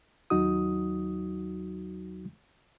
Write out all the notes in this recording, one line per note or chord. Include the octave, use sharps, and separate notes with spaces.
D#2 F#3 D#4 F#4 D#6